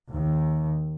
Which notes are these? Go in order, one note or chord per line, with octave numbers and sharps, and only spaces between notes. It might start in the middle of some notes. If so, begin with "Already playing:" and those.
D#2